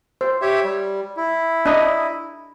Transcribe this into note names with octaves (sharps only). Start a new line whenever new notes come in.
C5
G4 C#5 E5
G3
E4
D4 D#5